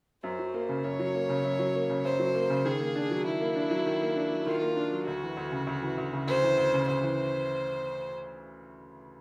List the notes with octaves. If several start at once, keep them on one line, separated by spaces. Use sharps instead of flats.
F#2 C5
F#3
A#3
C#3
F#2 C#5
F#3
A#3
C#3
F#2
F#3
A#3
C#3
F#2 C5
F#3
A#3
C#3
D#3 G#4
A#3
D4
F#3
D#3 E4
A#3
D4
F#3
D#3
A#3
D4
F#3
D#3 F4
A#3
D4
F#3
D2 F#4
E3
D2
C#3
D2
E3
D2
C#3
D2 C5
E3
D2
C#3
D2 C5
E3